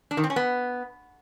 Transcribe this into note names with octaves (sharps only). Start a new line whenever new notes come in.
D4
D#3
C4
C#4
B3